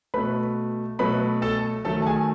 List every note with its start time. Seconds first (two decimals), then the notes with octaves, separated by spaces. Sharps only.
0.14 B2 A3 B4 B5
0.99 B2 F#3 A3 B4 B5
1.42 A4 A5
1.85 D#3 F#3 A3 A4 A5
2.02 A5
2.06 G#4 G#5